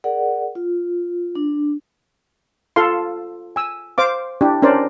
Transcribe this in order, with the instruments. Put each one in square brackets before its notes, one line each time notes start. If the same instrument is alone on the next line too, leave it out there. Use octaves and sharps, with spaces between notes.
[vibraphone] G#4 A#4 D5 F#5
F4
D4
[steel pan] F4 A4 F5 C6
G#5 E6
C5 F5 D6
D4 E4 G4
C#4 D4 A#4 C5 D5